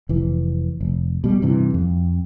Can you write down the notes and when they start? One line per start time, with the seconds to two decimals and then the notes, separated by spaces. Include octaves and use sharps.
0.09 F1 E3
0.81 F1
1.24 B2 G3
1.42 G2 C3 E3
1.74 F2